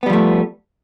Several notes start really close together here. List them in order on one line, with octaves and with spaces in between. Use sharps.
B3 G3 F3 A3